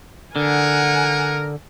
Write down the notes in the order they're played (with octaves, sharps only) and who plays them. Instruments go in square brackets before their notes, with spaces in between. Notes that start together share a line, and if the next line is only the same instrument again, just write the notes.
[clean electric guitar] D3 [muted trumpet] A#4 [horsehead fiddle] F#5 G#5